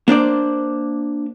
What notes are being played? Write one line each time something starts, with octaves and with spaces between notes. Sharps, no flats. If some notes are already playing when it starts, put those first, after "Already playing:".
A#3 D4 C5 D5